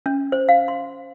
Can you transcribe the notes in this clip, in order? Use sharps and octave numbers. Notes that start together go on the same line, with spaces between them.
C#4
C5
F5
C6